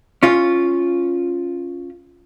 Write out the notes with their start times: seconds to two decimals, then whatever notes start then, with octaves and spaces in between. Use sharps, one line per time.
0.23 C#4 F4